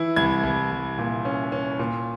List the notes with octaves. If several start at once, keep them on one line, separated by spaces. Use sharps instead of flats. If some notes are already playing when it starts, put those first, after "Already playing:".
Already playing: E3 E4
C2 G#6
C2
C2
A#2
C#4
C#4
A#2